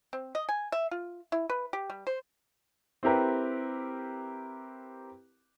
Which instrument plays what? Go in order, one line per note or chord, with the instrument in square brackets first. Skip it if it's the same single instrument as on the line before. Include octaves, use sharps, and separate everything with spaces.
[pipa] C4
D#5
G#5
E5
F4
E4
B4
G4
G3
C5
[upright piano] C4 E4 G4 A#4 B4